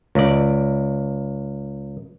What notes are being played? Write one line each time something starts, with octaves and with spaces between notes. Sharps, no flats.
C#2 D5